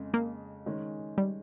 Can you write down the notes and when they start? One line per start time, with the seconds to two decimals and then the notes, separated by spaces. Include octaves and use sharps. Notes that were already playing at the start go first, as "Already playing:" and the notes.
Already playing: F2 C#3 G#3
0.14 A#3
0.66 D#3 G#3 C#4
1.18 G3